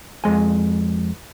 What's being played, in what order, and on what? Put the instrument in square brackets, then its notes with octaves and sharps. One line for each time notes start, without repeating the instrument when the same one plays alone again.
[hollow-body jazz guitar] F2 G#3 G#5